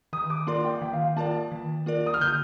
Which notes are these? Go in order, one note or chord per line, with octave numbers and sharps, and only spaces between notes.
D#3 D#6
D6
A#3 F4 A#4 D5 C6
G5
D#3 G5
F5
G5
A#3 F4 A#4 D5 A5
D#3
A#3 F4 A#4 D5
D#6
F6
D3 G6